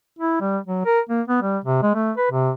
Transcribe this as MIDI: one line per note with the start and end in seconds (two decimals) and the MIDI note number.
0.19 0.38 64
0.41 0.58 55
0.66 0.82 54
0.85 1.00 70
1.10 1.22 58
1.28 1.40 59
1.42 1.58 55
1.65 1.81 48
1.83 1.94 56
1.95 2.12 57
2.17 2.27 71
2.32 2.51 48